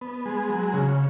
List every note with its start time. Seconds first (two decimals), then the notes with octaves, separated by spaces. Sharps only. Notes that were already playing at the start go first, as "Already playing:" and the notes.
0.01 B3
0.26 G#3
0.49 F#3
0.73 C#3